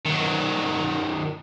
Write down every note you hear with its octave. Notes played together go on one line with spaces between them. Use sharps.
D#3 F#3